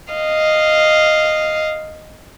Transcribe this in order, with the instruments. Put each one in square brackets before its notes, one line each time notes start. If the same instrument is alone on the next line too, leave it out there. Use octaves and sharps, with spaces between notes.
[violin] D#5 F5